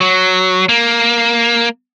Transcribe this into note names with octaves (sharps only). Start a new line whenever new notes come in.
F#3
A#3